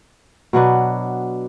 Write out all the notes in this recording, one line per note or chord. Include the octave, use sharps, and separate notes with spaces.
B2 F#3 B3 D4